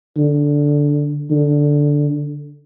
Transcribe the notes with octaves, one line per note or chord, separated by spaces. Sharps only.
D3
D3